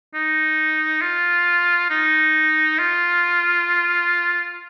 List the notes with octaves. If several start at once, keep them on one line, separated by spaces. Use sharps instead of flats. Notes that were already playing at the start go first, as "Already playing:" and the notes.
D#4
F4
D#4
F4